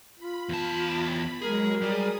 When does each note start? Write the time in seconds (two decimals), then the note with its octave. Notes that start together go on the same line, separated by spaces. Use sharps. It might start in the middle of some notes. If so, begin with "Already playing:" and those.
0.19 F4 B5
0.49 E2 A5
1.42 F#3 G#3 G#4 A#4
1.82 G3 G#4 D#6